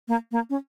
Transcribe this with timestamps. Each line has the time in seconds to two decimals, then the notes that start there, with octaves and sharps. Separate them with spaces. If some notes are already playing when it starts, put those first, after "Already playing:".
0.08 A#3
0.32 A#3
0.50 C#4